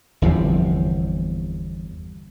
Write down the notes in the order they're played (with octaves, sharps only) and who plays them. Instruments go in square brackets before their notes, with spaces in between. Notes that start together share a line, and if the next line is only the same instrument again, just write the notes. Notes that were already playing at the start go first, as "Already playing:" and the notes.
[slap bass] G1 E2 C3 F3